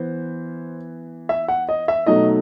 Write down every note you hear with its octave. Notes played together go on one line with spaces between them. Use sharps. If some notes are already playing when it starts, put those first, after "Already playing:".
Already playing: E3 B3 C5
E5
F#5
D#5
E5
B2 F#3 A3 D#4 D#5